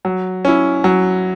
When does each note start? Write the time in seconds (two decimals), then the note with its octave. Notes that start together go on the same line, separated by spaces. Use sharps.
0.05 F#3
0.45 C#4 E4
0.84 F#3